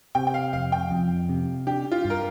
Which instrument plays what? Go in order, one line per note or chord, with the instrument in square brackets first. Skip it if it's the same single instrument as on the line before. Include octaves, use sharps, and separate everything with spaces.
[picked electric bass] C3 [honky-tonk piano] G5
[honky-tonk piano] G5
F5
[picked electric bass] F1 [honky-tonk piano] F5
[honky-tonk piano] G5
[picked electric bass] F2
C3
[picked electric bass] D4 [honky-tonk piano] G4
[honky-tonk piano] F4
[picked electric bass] G2
[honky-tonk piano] A#4